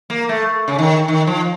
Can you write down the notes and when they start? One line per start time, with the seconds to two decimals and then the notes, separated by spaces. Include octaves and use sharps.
0.10 A#3
0.29 A3
0.68 C#3
0.79 D#3
1.08 D#3
1.27 F3